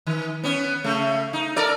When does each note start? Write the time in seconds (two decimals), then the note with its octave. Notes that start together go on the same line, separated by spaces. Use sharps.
0.07 D#3
0.44 B3 C#4
0.84 C#3 A3
1.33 D#4
1.56 A4 A#4 D5